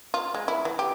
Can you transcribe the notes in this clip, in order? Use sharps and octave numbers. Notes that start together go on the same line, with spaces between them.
F4
G#3
E4
E3
G4